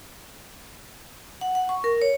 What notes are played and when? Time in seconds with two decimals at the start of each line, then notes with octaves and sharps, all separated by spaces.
1.41 F#5
1.55 F#5
1.69 C#6
1.84 A#4
2.02 C#5